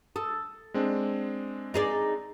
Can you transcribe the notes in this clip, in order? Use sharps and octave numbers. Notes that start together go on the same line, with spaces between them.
A4 D#6
G#3 C4 D4
D#4 G#4 D5